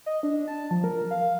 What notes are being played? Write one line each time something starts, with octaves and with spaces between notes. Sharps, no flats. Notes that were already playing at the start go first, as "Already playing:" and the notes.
D#5
D4
A5
F3
A#4
F5